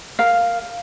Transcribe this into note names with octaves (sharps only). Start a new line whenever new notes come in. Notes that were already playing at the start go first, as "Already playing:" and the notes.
A#4 F5